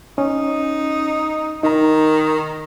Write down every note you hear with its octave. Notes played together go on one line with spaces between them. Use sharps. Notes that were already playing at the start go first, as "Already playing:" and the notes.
C#4 D#4
D#3 D#4 A#5